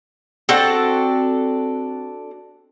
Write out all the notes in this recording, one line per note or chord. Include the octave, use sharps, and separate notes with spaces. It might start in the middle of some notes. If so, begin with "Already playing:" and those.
C4 D4 F#4 A4